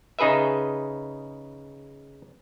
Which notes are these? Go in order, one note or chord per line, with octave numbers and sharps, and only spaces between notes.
C#3 D#4 G#4 B4 E5